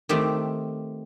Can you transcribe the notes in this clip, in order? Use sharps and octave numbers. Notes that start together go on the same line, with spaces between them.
D#3 A3 C4 G4